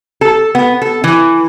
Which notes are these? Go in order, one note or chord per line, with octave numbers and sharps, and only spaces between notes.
A4
B3
A4
E3